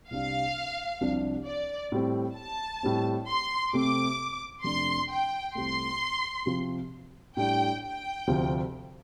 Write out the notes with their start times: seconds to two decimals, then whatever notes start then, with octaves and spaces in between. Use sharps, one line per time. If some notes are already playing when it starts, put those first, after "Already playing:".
0.10 C2 C3 G3 D4 F5
1.01 C2 C3 F3 D4
1.46 D5
1.92 A2 G3 C4
2.37 A5
2.83 A2 G3 C4
3.28 C6
3.73 C3 A3 C4 D6
4.64 F2 C3 A3 D4 C6
5.10 G5
5.55 C2 C3 A3 C6
6.46 C3 F3 C4
7.37 A2 G3 D4 G5
7.82 G5
8.27 D2 C3 F3 C4